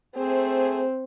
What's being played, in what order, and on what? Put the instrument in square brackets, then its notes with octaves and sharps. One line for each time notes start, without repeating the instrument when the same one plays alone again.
[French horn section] A3 G#4 C5 [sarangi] C4